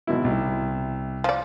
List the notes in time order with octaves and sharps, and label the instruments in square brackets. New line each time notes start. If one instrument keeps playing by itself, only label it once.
[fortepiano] G#1 B2 E4
C2
[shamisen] F3 D5